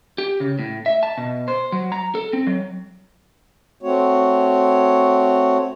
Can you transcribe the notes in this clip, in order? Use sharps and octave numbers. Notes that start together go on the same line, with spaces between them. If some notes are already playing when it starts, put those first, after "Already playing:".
G4
C#3
A2
E5
A5
B2
C5
F#3
A#5
A4
C4
F#3
A3 C4 F#4 C#5